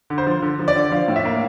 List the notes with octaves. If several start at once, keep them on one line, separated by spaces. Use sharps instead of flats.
D3
C5
F3
D3
F3
D5
D3
F3 F5
A2
E5
A#3